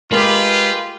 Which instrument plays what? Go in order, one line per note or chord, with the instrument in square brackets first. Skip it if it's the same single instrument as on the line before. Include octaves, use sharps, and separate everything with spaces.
[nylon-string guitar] G#3 A#4 G#5 [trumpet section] F4 G4 [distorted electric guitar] B4